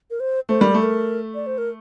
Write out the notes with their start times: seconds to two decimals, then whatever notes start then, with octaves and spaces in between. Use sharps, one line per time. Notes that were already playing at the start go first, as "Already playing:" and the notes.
0.10 A#4
0.20 C5
0.49 A3 C5
0.61 G3 A#4
0.72 A3 A4
0.83 A#4
1.35 D5
1.47 C5
1.58 A#4